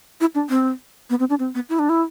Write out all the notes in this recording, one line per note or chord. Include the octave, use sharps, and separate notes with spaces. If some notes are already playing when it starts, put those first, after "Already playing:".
E4
D4
C4
B3
C4
D4
C4
B3
E4
D4
E4